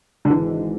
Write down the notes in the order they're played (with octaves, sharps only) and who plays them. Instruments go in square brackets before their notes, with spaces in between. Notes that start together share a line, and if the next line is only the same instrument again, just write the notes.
[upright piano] D3
[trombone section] G#1 G#2 G#3 [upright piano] E3